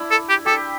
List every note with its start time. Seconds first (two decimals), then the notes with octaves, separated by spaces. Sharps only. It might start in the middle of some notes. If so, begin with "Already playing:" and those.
Already playing: D4 E4
0.11 A4
0.29 G4
0.46 G4 A4